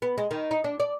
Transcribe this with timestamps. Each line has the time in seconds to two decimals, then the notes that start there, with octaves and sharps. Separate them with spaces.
0.02 B3
0.18 G#3
0.31 D#3
0.51 D#4
0.64 D4
0.80 D5